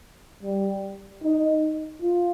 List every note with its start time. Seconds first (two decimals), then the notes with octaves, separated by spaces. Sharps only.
0.43 G3
1.23 D#4
2.02 F4